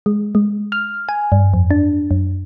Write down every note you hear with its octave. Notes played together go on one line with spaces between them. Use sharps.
G#3
G#3
F6
G#5
G2
F2
D4
F#2